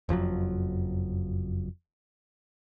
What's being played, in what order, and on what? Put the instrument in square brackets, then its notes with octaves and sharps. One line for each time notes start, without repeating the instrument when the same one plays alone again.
[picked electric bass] F#1 F2 F3 F#3